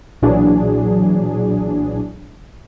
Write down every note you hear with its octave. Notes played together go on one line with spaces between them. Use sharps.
B1 A#2 E3 F#3 D4 G#4